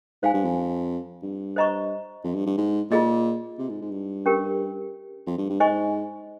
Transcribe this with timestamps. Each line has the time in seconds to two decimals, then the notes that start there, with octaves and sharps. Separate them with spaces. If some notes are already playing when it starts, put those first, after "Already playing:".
0.22 G#2 C5 F5 G#5
0.34 G2
0.44 F2
1.23 G2
1.56 C5 D#5 A#5 C#6
2.24 F2
2.35 G2
2.46 G2
2.58 G#2
2.91 A#2 F4 G#4 D#5
3.58 C3
3.69 G#2
3.81 G#2
3.91 G2
4.26 C#4 G4 A#4
5.27 F2
5.38 G2
5.49 G2
5.60 G#2 C5 D#5 G#5 C#6